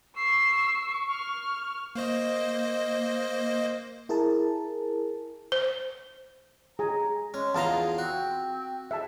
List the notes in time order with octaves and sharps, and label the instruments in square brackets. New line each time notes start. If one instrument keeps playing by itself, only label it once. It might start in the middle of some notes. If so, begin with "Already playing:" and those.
[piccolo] C#6 [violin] E6 C7
[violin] F6
[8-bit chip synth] A#3 C5 D#5
[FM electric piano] E4 G#4 A#4 A5
[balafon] C5
[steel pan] G#4 G#5 [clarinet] A#5
[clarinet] G#3 [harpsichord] C#4
[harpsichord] E2 F4 C6 [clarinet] G#4 [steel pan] A5 A#5
[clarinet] C4 [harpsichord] F#4
[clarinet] G#4 [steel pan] E5 A5